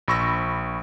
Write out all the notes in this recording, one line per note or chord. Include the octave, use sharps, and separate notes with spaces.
A#1 B5 C#6 E6 A#6